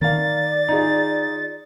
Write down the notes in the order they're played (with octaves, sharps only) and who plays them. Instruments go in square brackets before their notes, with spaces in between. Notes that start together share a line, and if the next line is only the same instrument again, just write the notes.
[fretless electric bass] D#3 [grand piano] A#3 F5 [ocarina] D5 [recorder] A6
[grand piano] D#4 F4 G#4